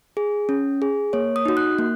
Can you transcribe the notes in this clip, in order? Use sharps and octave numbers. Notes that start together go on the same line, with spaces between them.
G#4
C#4
G#4
A#3 C#5
D#6
D#4 F#4
F#6
A#3